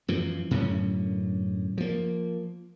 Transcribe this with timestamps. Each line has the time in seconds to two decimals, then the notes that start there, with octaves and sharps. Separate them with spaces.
0.08 F#2 E3 F3
0.51 F#2 A2 D3 C#4
1.78 F3 A#3